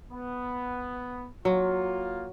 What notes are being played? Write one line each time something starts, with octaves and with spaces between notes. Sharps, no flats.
B3
F#3 A#3 F4